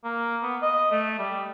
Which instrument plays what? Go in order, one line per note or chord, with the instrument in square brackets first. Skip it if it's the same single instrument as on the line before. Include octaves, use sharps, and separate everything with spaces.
[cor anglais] A#3
B3
D#5
A3
G3